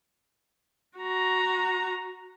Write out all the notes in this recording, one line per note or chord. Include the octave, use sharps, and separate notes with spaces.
F#4 A#5